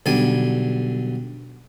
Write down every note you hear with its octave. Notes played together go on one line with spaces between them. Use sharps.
B1 D3 G3 G#5